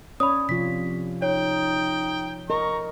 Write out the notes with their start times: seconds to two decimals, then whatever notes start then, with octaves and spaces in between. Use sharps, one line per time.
0.20 C#4 C#5 D5 B5 D#6
0.49 C3 F3 F4 B6
1.22 D#4 C#5 G5
2.50 A#4 D#5 A#5 C#6